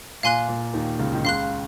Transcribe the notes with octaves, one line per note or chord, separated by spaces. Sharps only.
A#2 F5 G#5 C6 F#6
A#2
D#2 D#3
C#2 C#3
D#3
C#2 C#3 F5 C6 F#6